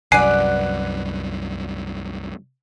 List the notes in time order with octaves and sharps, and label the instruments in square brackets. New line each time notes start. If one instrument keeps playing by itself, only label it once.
[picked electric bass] C2 F#2 [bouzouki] B4 D5 F#5 [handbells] G#5 C7